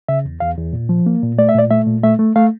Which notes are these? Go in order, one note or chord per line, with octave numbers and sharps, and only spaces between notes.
C#3 E5
E2
E2 F5
E2
A#2
F3
A#3
A#2
A3 D5
E5
A#2 D5
A3 E5
A#2
A3 E5
A3
A3 F5